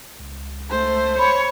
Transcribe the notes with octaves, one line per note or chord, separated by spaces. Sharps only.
C#2
A3 C5
C#5 B5